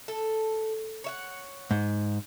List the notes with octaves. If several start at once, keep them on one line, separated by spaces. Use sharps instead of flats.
A4
C#5 E5 F#5
G#2